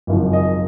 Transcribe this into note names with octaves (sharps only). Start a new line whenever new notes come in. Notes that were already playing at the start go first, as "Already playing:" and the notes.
G#1 F#2 C#3 F3
D#5